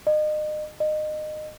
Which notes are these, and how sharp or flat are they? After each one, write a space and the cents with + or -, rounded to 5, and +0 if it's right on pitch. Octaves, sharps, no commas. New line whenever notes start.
D#5 -35
D#5 -25